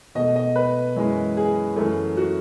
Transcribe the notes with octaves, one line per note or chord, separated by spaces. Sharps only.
B2 A3 D#5
D#5
B4
F#2 E3 G#3
G#4
F#2 E3 A3
F#4